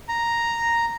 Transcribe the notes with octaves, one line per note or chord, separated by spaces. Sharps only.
A#5